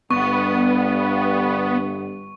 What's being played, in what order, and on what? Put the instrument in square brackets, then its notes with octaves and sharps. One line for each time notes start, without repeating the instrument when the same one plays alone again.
[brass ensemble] G1 G2 [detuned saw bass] B3 [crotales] C#6